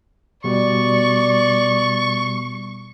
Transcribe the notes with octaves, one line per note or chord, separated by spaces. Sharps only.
B2 G3 B3 D5 C#6